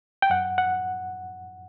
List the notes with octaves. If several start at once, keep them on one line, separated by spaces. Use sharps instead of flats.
G5
F#2 F#5
F#5